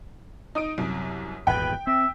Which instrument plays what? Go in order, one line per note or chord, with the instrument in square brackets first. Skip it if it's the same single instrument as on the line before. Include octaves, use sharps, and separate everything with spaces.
[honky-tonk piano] D#4 D#6 D7
C2 F#2 C3
[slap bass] D#1 G#1 E2 [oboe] B4 [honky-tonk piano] G5
[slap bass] C4 [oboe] E5